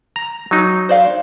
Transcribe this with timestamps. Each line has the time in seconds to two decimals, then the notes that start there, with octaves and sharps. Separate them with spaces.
0.16 A#5
0.51 F#3 D#4
0.89 C5 D5 F5